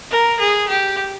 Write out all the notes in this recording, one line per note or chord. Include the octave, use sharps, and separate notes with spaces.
A#4
G#4
G4